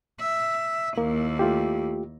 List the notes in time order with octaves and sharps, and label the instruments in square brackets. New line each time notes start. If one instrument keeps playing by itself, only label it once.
[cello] E5
[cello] D#2 E4 [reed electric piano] A#3
[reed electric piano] A3 F4 G4